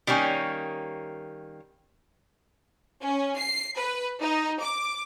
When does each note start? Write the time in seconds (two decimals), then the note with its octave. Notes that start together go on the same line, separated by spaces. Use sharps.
0.07 D#3 G3 A#3 C#4 C#5
3.06 C#4
3.39 C7
3.79 B4
4.20 D#4
4.61 D6